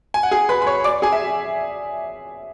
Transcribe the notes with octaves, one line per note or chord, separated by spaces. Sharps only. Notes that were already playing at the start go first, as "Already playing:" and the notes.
G#5
F#5
G#4 G#5
B4 B5
B5
C#5 C#6
D5 D6
G#4 G#5
E5